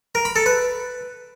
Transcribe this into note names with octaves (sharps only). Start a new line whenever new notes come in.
A#4
B5
A4
B4